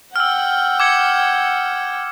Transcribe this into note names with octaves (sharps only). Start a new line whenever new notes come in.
F#5 G5 E6 F6
D6 G#6 C#7